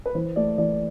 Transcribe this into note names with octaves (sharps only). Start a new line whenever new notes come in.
B4
E3 C5
A3 D5
E3 D5